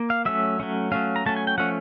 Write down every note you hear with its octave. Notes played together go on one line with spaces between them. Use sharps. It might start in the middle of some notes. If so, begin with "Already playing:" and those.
Already playing: A#3
F5
F#3 A3 C#4 E5
F#3 A3 C#4
F#3 A3 C#4 F5
A#5
F#3 A3 C#4 A5
G#5
G5
F3 A3 C#4 F#5